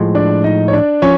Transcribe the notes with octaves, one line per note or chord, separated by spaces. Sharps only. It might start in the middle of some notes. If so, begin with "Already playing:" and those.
Already playing: A2 F3 G#3
D4 D5
D#4 D#5
C#5
D4 D5
F3 C#4 C#5